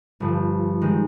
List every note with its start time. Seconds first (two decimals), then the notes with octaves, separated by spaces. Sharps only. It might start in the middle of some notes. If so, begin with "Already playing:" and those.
0.20 G1 G2 F3
0.81 D#3 G#3 C4